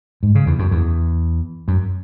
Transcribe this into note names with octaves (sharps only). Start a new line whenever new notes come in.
G#2
C#3
E2
F#2
E2
F#2